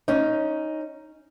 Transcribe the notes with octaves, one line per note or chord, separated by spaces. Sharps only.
C#4 D#4